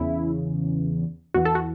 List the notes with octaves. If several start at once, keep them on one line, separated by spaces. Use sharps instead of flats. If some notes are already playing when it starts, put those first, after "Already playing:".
Already playing: E2 C#3 E3 E4
E2 E3 F#4
A4
F#4